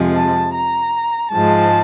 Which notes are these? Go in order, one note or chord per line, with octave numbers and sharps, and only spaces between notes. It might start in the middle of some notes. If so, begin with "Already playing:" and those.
Already playing: F2 C3 F3 G#3
A5
A#5
G#2 F3 G#3 A5